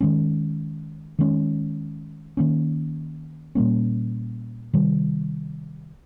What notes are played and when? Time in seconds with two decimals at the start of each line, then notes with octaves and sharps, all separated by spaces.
0.01 D#3 G#3 C#4
1.19 D#3 G#3 C#4
2.37 D#3 A#3 C#4
3.55 A#2 G3 A#3 C#4
4.73 C3 D#3 G3